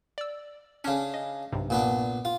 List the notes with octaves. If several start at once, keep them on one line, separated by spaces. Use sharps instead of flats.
D5 E6
C#3 C#4 D4
D#5
B1 G2 C3
A#2 B3 D4
F4